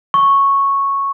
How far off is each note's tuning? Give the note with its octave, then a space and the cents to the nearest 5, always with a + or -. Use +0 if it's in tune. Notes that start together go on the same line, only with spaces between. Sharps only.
C#6 -5